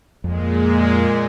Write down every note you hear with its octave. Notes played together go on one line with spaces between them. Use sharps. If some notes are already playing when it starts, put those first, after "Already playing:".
F2 A#2 G#3